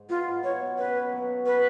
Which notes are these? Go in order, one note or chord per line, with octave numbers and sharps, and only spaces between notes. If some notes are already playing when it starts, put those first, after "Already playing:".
Already playing: G#2
B3 F4
G#2
F#3 C#5
B2
C#4 B4
B2
F#3
B2
C#4 B4